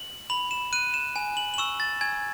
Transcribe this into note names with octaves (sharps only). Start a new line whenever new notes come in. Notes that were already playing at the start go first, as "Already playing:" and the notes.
Already playing: F#7
B5 F#7
E7
F#6 D#7
E7
G#5
F#7
F#7
C#6 E6 E7
A6
G#5 G#6